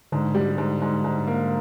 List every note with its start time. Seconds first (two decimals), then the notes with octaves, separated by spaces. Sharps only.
0.12 G#2 D3
0.35 G3
0.58 G#2
0.82 G#2
1.04 G#2
1.27 A#3